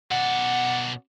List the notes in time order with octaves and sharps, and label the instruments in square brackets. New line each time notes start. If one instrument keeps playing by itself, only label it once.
[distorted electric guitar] B2 D5 [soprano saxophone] F#5